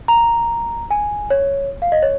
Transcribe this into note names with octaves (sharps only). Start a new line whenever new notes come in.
A#5
G#5
C#5
F5
D#5
C#5